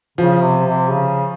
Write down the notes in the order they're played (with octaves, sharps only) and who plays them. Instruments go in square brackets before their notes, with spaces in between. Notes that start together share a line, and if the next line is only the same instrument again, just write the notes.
[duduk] C#3 [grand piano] F3
[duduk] C3
C3
C#3